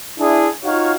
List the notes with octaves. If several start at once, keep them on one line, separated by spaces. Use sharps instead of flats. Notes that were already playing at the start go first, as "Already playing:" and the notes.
D4 E4 G#4
D#4 F4 F#4 C#5 F5